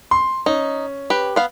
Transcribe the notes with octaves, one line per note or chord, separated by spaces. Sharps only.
C6
C#4 D#4
G4 B4
B3 F5